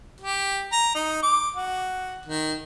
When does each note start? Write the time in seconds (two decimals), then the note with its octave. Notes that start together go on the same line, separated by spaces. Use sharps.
0.21 G4
0.73 A#5
0.95 D#4
1.23 D6
1.56 F#4
2.25 D#3